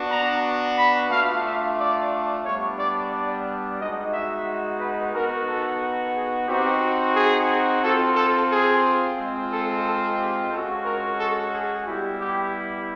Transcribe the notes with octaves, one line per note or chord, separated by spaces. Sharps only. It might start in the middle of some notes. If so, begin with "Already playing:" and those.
Already playing: B3 D4 F#4
A#5
B5
A3 D4 F4 F5
E5
D5
G3 B3 D4 C#5
D5
D5
G#3 B3 D#4 F#4 D#5
E5
B4
B3 D#4 F#4 A#4
A4
G#4
C4 D#4 F#4 G4
G#4
C4 F4 A4
A4
G#4
G#3 C4 F4
A4
A4
G4
G#3 C#4 F#4 A4
A#4
A4
G#4
G3 B3 E4 G4
G4